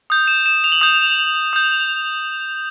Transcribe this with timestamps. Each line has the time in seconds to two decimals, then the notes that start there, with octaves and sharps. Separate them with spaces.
0.10 D#6 G6
0.28 E7
0.46 E7
0.64 F7
0.72 F#7
0.81 D#6 G6 F7
1.53 D#6 G6